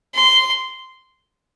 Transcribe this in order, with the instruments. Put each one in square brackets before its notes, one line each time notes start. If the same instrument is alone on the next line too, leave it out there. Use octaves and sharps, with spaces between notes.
[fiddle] C6